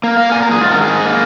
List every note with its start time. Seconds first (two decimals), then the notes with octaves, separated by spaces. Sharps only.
0.03 A#3
0.17 A#3 F5
0.32 A#2 G#5
0.42 A#5
0.47 A#2 G#4
0.61 G#2 F4
0.72 A#4
0.76 D#3
0.81 G#4
0.90 G#2
1.05 A#3